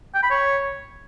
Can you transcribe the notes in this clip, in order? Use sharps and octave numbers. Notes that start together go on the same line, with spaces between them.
G5
B5
C#5